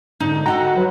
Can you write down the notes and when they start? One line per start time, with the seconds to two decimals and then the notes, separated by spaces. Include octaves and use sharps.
0.20 G#2 D3 D#4
0.46 F#4 A4 D#5 F#5 G5 A#5
0.76 F#3 B4